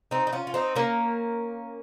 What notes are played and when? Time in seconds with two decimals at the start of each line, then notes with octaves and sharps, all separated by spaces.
0.11 C4 D#4
0.27 D#4
0.33 C#4 F4
0.47 F4
0.54 C4 D#4
0.75 A#3 C#4